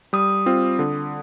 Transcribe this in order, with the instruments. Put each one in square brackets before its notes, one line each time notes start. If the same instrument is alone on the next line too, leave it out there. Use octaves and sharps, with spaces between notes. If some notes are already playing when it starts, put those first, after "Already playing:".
[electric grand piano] G3 [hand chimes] D#6
[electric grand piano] C4 F4
D3